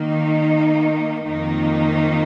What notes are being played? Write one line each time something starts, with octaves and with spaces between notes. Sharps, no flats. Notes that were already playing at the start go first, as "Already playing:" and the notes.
Already playing: D#3 A#3 D#4
F2 D#3 A#3 D#4